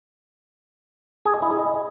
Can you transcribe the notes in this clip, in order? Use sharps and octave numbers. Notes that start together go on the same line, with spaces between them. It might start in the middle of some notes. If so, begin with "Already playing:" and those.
G#4
D#5
E4
G#4
D#5